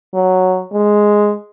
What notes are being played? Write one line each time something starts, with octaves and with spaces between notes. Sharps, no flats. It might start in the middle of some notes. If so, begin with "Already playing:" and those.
F#3
G#3